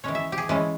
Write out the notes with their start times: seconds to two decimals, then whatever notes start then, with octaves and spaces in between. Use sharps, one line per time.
0.04 E3 G#3 C#4 C#5
0.15 E5
0.32 G4
0.38 G#4
0.49 E3 G#3 C#4